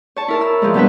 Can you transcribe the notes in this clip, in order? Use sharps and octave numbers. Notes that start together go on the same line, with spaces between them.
C#5 A5
E4 A#4 A5
E6
F3 G#3
B2 G3 B3 D4 B4